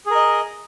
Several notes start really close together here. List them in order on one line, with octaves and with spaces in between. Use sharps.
G#4 A#4 D#5